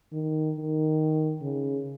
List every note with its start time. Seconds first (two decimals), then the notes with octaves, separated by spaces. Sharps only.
0.12 D#3
0.56 D#3
1.41 C#3